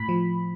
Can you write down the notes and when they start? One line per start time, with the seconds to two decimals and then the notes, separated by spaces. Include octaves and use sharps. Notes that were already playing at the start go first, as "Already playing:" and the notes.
Already playing: A2 B5
0.09 F3